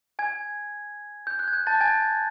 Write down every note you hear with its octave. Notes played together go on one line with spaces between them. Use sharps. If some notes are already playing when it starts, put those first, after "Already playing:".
G#5 G#6
G6
F#6
G#6
G6
A5 A6
G#5 G#6